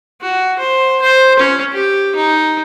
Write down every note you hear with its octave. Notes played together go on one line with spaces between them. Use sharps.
F#4
C5
C5
C#4
G4
D#4